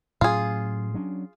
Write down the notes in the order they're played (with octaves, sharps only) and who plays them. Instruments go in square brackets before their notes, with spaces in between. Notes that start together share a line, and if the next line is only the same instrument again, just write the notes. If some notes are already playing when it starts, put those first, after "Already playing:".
[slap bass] A2 F#3 C#4 [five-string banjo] F4 G#4
[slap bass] F#3 C#4 D4